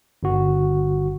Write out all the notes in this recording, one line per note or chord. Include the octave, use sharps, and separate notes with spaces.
G1 F#4